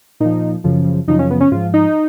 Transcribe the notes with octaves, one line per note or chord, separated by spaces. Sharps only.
A#2 F3 D#4
F#2 C#3 F3
F#2 C#3 F3 D#4
C#4
B3
C#4
G#2 F3 F4
D#4